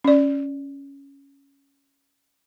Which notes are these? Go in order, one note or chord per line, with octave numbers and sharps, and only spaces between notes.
C#4 D5